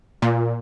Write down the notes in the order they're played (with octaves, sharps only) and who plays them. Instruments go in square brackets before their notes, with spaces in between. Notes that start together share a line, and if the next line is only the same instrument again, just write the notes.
[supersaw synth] A#2